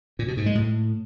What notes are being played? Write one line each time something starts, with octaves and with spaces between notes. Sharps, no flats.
A#2
B2
G#2
G#3
A2